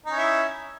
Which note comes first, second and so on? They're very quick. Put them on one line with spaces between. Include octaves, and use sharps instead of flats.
D#4 C#4 E4